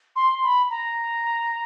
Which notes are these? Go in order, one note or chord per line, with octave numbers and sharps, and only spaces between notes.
C6
B5
A#5